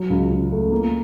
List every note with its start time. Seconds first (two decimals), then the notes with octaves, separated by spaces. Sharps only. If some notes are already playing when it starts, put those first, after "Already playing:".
Already playing: F#3
0.10 C#2
0.31 C#3
0.52 A3
0.72 A#3